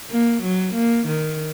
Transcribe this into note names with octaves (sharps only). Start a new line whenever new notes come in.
A#3
F#3
A#3
D#3